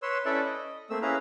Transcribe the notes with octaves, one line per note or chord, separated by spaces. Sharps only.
B4 C#5 C6 E6
C#4 E4 A4 B4 D5 E5
D#5
A3 A#3 C4 E6
C#4 E4 G#4 B4 F5 A#5